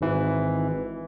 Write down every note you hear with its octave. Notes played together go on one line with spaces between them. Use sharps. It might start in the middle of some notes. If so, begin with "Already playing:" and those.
G#1 G#2 E3